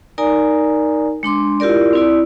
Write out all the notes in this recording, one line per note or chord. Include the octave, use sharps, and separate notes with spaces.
D#4 A#4 D5 G#5 A#5
G#3 D4 C6 D6
E4 F4 G4 A#4 D5
C4 E4 D5